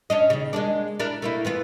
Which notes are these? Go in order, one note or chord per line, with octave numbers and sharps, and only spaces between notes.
C#4 D4 D#5
D#2 C#3
G#3 A#3 D4
D4 E4 A#4
A3 A#3 E4
E3 B3 F4